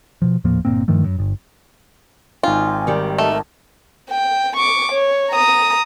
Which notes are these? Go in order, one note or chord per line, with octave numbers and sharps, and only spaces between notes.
B2 F3
D#1 A2 F3 A#3
G1 A#2 A#3 C4
G2 D#3 F3 A3
F#2
G1
G#1 D#4 F4 G5 G#5
D#3 G3
A3 A#4 D#5 A5
G5
C#6 D6
C#5
A#5 D#6